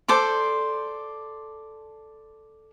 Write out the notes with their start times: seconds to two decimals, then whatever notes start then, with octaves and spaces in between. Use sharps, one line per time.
0.08 A4 C5 D5 D6